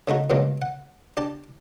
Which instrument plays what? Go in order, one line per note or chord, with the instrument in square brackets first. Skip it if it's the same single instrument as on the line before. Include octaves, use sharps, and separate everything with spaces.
[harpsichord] C#3 A3 D#4 F#4
G2 A#2 C#3 F#3 G#3
F#5
D4 G4 A5